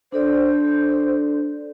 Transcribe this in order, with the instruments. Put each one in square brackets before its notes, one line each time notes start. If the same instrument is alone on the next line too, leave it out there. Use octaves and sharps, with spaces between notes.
[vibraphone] D4 A4 D5 [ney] C5